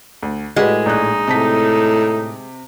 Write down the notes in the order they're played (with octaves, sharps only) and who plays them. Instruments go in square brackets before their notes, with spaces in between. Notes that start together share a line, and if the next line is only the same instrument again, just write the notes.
[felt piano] D2
[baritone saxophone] A2 [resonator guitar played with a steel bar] G#3 [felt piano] F#4 G4 B4
[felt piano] A#1 F#6 [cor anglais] D#4
[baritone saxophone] A2 [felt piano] C3 A5 B6